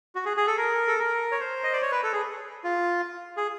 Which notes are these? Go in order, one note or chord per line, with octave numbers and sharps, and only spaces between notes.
F#4
G#4
G#4
A4
A#4
A4
A#4
C#5
C5
D#5
D5
C#5
B4
A4
G#4
F4
G#4